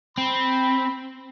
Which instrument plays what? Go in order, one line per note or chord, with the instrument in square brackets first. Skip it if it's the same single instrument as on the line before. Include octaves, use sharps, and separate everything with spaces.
[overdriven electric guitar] C4 [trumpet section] B5